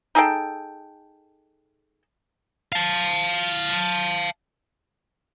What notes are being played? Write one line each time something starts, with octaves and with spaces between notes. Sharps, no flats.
D#4 G#4 A4 G5
F5 A5